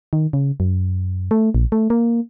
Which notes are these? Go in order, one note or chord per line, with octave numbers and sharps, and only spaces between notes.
D#3
C#3
F#2
A3
A#1
A3
A#3